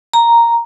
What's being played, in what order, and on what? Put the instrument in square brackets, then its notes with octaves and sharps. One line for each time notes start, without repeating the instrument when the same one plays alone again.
[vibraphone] A#5